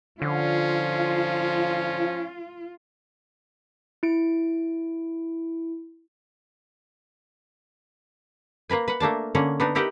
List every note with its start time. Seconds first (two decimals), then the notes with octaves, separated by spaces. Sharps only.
0.22 D3 F3 C#4 F4
4.03 E4 D7
8.69 A#3 A#4 B4 G#5
8.88 B4 F#5
9.00 A3 A#3 D4 A5
9.35 D3 A#3 C#4 F#5
9.60 B3 D4 D#4
9.75 D#4 E4 G4 A#4 D#5 F#5